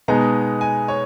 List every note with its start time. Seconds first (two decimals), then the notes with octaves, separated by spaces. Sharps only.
0.08 B2 G#3 B3 D#4 G#4 A#5
0.61 G#5
0.88 C#5